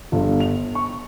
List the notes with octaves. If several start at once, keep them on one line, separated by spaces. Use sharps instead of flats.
G1
F7
C#6